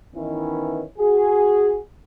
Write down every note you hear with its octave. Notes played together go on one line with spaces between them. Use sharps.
D#3 E3 B3 C#4 D#4 E4
F#4 G#4